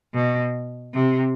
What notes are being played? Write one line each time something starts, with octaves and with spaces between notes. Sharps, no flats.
B2
C3